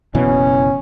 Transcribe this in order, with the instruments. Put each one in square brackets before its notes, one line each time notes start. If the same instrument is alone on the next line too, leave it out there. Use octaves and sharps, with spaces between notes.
[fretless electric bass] F#1 B2 E3 [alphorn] C#4